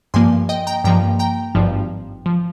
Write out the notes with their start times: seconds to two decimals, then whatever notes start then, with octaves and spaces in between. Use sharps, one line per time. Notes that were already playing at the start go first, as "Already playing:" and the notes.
0.14 G2 F3 A#3 G#5 C6
0.49 D#5 G5
0.67 G5 A#5
0.84 G2 F3 A#3 G5 A#5
1.19 G5 A#5
1.55 G#1 G2 F3
2.26 F3